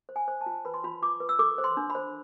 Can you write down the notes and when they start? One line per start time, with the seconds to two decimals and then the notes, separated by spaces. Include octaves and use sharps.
0.09 C5
0.16 G#5
0.28 C5
0.41 A5
0.46 F4
0.65 B4 B5
0.74 C6
0.84 F4 B5
1.02 F4 D6
1.20 B4
1.29 E6
1.39 A4 D6
1.58 C5
1.64 C6
1.77 D4
1.90 B5
1.95 C5